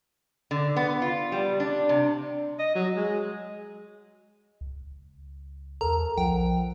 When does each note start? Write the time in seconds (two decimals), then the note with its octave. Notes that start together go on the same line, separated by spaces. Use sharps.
0.51 D3
0.76 B3
1.02 F4
1.32 G3
1.60 D4
1.89 C3
2.59 D#5
2.75 F#3
2.97 G#3
4.61 C#2
5.81 E2 A4 A#4 A#5
6.18 B1 F3 F#5 G5